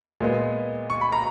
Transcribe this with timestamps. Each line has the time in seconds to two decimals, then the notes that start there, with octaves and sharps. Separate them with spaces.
0.20 A#2 G#3 B3
0.90 C#6
1.01 B5
1.12 A#5